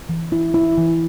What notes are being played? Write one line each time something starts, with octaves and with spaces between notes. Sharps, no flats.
E3
E4
E4
E3